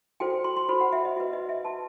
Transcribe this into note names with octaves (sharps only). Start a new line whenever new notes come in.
F#4 A4 C5 G5
C6
C6
F#4 A4 C5 B5
F#5
E5
D#5
F#4 B4 E5
D#5
E5
F#4 B4 A5